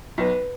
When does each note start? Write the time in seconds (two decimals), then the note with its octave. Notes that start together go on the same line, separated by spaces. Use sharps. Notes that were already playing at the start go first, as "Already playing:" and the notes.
0.18 B1 B4